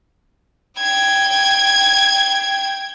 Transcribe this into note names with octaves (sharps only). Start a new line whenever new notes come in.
G5 G#6